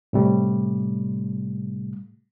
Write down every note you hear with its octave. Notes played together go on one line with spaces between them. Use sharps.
A2 C3 G3 A3